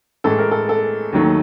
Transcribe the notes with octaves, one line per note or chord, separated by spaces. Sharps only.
A2 E3 G#3 A4
A#4
A4
A4
D#2 D#3 F#3 A3